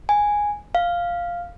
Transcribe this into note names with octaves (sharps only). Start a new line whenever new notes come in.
G#5
F5